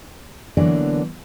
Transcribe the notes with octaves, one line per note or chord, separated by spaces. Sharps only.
D3 E3 F#3 A#3 B3 D4